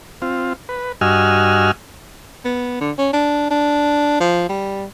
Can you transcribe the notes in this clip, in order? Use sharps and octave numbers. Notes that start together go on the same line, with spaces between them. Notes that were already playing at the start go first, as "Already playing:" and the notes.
C4 F4
B4
G2 F#4 D#5 G#5 E6 F6
B3
D3
C#4
D4
D4
F3
G3